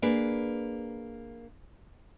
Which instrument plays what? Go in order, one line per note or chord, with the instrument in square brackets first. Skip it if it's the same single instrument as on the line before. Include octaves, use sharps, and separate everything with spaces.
[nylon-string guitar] A#3 D4 G#4 B4